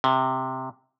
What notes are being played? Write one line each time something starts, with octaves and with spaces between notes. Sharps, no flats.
C3